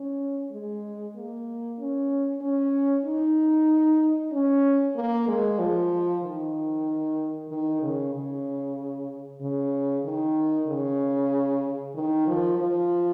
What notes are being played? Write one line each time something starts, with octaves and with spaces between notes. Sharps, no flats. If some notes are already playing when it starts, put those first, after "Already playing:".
Already playing: C#4
G#3
A#3
C#4
C#4
D#4
C#4
A#3
G#3
F3
D#3
D#3
C#3
C#3
C#3
D#3
C#3
D#3
F3
F3